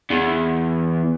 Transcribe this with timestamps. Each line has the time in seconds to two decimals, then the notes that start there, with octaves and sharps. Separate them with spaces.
0.11 E2